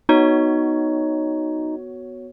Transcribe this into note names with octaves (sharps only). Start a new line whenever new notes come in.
B3 D#4 F#4 C#5